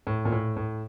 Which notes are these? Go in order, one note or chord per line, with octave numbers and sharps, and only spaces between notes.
A2
A#2
A2
A2